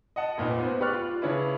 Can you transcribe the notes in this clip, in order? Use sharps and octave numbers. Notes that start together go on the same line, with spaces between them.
D#5 F#5 A5
F1 A#2 D#4 B4
B3 C5
G4 B4 D5 C#6 F6 F#6
F4
C#3 C#4 D4 E4 B4